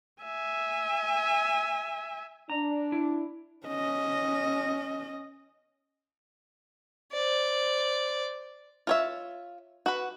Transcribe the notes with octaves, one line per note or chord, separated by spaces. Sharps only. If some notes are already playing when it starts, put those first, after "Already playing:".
E5 G#5
D4 A#5
E4
C#4 D#5
C5 D5
F4 C#5 E5
F#4 B4